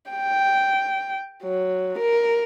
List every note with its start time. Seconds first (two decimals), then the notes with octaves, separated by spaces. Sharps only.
0.11 G5
1.44 F#3
1.99 A#4